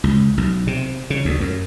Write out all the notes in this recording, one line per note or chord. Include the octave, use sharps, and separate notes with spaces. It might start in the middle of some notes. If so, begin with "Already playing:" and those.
C#2
B1
C3
C#3
D2
F#2